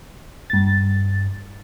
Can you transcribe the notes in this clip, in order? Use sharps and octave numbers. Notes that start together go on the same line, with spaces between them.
G2 A6